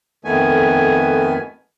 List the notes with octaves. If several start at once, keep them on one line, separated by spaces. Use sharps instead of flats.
F2 D#3 A3 B3 G#5